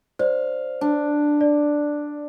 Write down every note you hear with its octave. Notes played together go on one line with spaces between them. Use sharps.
C5 D5 F5
D4
D5